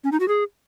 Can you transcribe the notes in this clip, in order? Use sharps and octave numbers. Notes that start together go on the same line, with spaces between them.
C#4
D#4
F#4
G#4